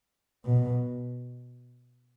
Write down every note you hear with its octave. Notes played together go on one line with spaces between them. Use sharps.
B2